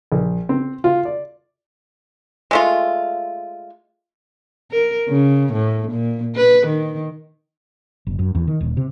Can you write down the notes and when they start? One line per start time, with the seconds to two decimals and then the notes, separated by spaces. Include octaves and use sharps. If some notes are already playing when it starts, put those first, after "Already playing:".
0.12 A#1
0.49 C4
0.84 F4
1.05 D5
2.51 G#3 A3 F4
4.71 A#4
5.09 C#3
5.53 A2
5.92 A#2
6.36 B4
6.67 D#3
8.07 F#1
8.19 F#2
8.35 E2
8.47 D#3
8.61 D#1
8.77 C3